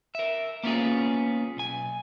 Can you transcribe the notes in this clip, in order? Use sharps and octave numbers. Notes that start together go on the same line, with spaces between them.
A#4 E5
A#3 B3 C#4 F4 G#4
B1 G#5